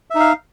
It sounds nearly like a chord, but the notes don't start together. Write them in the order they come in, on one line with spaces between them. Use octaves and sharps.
E5 D#4 F5